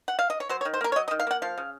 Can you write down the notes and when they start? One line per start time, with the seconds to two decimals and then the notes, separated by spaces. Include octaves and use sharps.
0.08 F#5
0.19 F5
0.30 D#5
0.40 C#5
0.49 F#3 C5
0.61 C#5
0.65 D#3
0.74 C5
0.81 A#3 A#4
0.92 C#5
0.96 F#3 D#5
1.08 D#5
1.11 D#3
1.20 F5
1.27 A#3 F#5
1.42 F3 F5
1.58 C#3